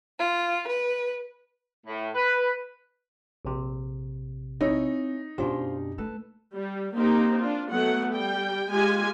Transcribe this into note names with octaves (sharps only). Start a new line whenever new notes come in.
F4
B4
A2
B4
A#1 C3
C4 D#4 E4 G#4 C#5
F#2 B2 D4 F4 G4 C5
A3 A4 B4
G3
A#3 C4 D#4 G4
D4 F4
F#3 A3 B3 F#5
G3 G5
G#3 F4 G4 G#5